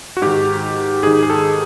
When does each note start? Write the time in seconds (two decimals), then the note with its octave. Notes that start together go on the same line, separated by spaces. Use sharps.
0.17 F#4
0.22 G#2 D#3 G4
1.03 G#2 D#3 G#4
1.23 G#4
1.30 A4